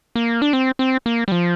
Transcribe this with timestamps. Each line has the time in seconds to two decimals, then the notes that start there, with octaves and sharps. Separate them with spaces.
0.15 A#3
0.42 D4
0.53 C4
0.79 C4
1.06 A#3
1.28 G3
1.32 F3